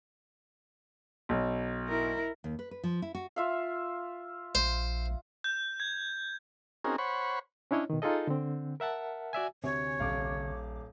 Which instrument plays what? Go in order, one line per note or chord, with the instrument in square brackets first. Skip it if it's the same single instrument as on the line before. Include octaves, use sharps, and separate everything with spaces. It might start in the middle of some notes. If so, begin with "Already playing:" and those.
[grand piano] B1
[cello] E4 A#4
[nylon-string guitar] D#2
B4
B4
F3
E4
F#4
[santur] F4 E5 F5
[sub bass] A#1 [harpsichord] C5
[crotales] G6
G#6
[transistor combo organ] C4 C#4 D#4 F#4 G#4 A#4
C5 C#5 F#5 B5 C#6
[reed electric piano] C#4 D4 E4 C#5 D#5
B2 D#3
D#4 F4 G#4 A4 D#5
D3 C4
A#4 E5 F#5 A5
F#4 D5 E5 G#5
[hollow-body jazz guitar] D2 C3 [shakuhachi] C#5 [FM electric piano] G#5
[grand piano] D#1 F5 [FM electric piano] A#1 D6